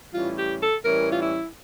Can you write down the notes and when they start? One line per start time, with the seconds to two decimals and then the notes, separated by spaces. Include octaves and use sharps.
0.11 A2 E3 G3 C#4 F4
0.36 G4
0.59 A4
0.82 A2 E3 G3 C#4 A#4
1.10 F4
1.19 E4